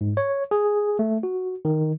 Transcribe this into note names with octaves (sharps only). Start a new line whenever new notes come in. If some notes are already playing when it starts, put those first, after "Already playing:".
G#2
C#5
G#4
A3
F#4
D#3